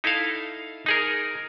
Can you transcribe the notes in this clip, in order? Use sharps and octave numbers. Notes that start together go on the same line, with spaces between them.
D#4 E4 A4 E5 F5
D#4 G#4 A#4